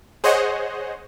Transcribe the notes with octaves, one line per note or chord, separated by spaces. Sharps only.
G#4 C5 C#5 D#5 F#5